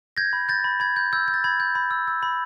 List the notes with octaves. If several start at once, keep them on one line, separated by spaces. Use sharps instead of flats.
G6 G#6 A#6
B5
G6 A6
B5
B5 G#6
G6
E6 G6
G6
A6
B5 G#6
G6
B5
E6
E6
B5